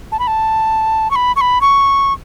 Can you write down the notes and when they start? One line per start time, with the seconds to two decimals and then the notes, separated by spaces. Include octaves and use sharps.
0.12 A5
0.19 B5
0.27 A5
1.11 C#6
1.16 B5
1.36 C#6
1.41 B5
1.61 C#6